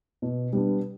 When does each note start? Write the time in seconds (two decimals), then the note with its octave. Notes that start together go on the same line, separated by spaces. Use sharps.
0.22 B2
0.53 G3 B3 D4